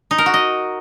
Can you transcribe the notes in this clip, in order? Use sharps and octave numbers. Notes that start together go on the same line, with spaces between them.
D#4
A#4
F#4
D#5